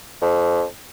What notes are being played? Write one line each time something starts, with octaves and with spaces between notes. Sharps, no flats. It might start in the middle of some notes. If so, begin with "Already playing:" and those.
F2